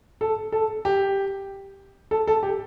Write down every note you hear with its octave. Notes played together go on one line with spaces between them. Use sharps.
A4
A4
G4
A4
A4
G4